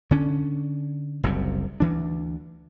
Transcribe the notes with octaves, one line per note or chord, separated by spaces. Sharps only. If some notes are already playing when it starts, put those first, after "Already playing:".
D3 C#4 D4
F#1 C2 F#2 C3
D2 E3 D4